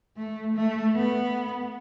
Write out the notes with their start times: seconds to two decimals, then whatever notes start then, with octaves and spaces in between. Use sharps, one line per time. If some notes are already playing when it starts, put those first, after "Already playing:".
0.17 A3
0.55 A3
0.95 B3